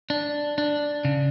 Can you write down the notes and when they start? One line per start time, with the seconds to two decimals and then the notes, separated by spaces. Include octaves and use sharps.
0.10 D4
0.58 D4
1.05 C#3